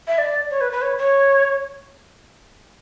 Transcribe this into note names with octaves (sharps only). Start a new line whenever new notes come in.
E5
D5
C#5
B4
B4
C#5
C#5